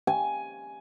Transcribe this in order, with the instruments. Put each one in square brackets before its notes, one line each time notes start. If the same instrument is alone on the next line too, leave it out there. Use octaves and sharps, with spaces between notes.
[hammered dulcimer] G#5